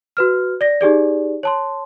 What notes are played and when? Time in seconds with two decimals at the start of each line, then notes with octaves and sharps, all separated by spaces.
0.17 F#4 B4 F6
0.61 D5 A#6
0.81 D#4 G4 G#4 D5
1.43 C#5 A5 C6